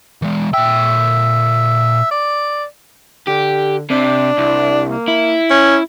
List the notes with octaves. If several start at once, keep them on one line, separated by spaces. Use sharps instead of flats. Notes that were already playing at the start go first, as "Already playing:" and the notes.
E3 G#3
A#2 E5 G5
D5
D3 G4
C3 D4
C2
A#3
E4
C#4